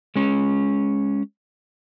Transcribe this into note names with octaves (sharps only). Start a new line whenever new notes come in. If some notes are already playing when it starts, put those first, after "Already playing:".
G#3 C#4